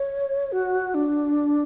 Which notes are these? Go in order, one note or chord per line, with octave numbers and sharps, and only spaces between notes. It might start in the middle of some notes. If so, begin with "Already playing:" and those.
Already playing: C#5
F#4
D4